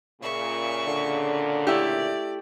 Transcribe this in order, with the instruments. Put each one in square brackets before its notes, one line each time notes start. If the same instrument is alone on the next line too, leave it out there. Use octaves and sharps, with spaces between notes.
[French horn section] A#2 C#3 [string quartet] E5 C#6
[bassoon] D3
[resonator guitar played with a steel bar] A3 E4 G4 [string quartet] D5